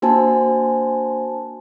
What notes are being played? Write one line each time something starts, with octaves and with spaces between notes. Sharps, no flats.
A#3 D4 F#4 C5 G#5 A5